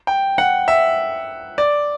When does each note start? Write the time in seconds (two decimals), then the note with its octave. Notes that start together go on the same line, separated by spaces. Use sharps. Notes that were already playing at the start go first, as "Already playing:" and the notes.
0.07 G5
0.38 F#5
0.68 E5
1.58 D5